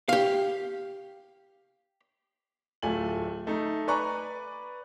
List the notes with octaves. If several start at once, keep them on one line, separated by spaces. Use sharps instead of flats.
G4 F5
D1 A3 F4 G#5 F#7
A3 D#4
B4 D5 G#5 A#5 C#6 F#6